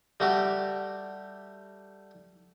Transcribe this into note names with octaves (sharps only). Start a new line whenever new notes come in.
G3 A3 F#4 G4